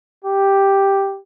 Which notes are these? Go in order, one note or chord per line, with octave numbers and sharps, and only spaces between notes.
G4